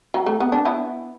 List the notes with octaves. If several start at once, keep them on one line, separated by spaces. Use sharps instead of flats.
F#3
A3
B3
D4
B3 E4